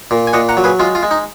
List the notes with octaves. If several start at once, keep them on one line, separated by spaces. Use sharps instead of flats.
A#2
G#5
A#2 D#5 F#5
F#5 A#5
F#3
G#4 B4
G#3 F4
F4
G#3
D#4